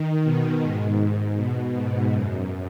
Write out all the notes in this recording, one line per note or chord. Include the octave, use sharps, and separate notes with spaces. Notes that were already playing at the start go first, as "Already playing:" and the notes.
Already playing: D#3
B2
G#2
B2
G#2
F#2